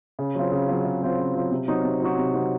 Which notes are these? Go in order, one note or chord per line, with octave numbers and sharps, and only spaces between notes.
C#3
F#3 C4 F4
C#3
F#3 C4 F4
C#3
F#3 C4 F4
C#3
F#3 C4 F4
C3
F#3 C4 D#4 F#4
C3
F#3 C4 D#4 F#4
C3
F#3 C4 D#4 F#4